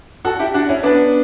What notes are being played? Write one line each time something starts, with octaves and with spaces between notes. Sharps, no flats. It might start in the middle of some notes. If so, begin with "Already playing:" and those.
F#4 A4
E4 G4
D4 F#4
C#4 E4
B3 D4